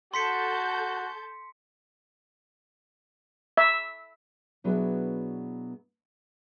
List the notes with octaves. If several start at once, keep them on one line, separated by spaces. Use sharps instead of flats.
F#4 A4 A5 C6 G6 B6 C#7
E5
B2 F#3 B3 D4 E4 G#4